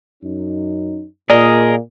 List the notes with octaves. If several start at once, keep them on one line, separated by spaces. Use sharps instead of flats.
F#2 C#4 D#4
A#2 G#4 A#4 D5 D#5